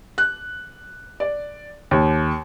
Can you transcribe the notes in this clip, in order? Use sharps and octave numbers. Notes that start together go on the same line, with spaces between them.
F#6
D5
D#2